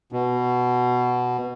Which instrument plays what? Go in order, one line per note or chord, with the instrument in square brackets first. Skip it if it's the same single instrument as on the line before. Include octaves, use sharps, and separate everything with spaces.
[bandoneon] B2